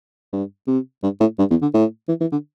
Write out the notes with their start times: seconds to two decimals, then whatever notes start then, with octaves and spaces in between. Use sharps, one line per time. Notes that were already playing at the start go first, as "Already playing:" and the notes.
0.33 G2
0.67 C3
1.03 G2
1.20 A2
1.39 G2
1.50 E2
1.62 D3
1.74 A2
2.08 E3
2.21 E3
2.32 D3